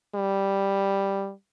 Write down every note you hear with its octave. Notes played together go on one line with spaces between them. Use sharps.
G3